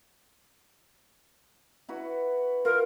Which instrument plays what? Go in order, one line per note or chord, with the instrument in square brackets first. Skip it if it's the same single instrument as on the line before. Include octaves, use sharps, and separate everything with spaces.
[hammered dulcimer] E4 F#4 B4
[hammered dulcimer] F4 [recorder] A#4